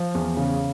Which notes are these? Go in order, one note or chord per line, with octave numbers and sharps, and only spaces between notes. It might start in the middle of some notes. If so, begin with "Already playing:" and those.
Already playing: F3
E2
C#3